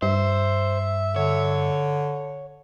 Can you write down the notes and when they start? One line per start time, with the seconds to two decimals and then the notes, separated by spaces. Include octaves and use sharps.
0.02 G2 C5 E5
1.16 D3 C#5